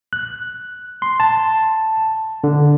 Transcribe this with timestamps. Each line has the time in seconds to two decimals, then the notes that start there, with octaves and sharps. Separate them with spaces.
0.13 F#6
1.02 C6
1.20 A5
2.44 D3